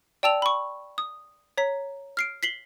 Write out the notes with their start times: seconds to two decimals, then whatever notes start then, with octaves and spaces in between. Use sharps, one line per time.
0.23 D5 G5 A5 E6 F7
0.42 B5 C#6
0.98 D#6
1.58 C#5 A#5 B6
2.17 F6 C7 D7
2.43 B6 C7 F#7 G7